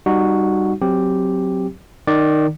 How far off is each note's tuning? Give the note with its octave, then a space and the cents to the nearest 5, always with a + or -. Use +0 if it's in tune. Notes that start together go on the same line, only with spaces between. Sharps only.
G3 +0 D#4 -20 F#4 +0
F#3 +0 C4 +0 G4 +0
D#3 -15 D5 +0